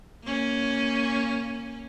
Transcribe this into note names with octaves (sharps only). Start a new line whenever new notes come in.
A#3 C#4